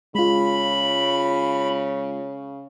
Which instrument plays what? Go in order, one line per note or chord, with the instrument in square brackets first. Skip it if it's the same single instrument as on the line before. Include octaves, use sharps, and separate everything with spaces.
[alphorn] C#3 [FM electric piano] G#3 F4 [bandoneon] B5